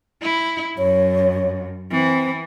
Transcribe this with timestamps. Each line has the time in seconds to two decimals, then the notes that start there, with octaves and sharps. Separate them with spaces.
0.23 E4
0.78 F#2 C#5
1.91 E3 C4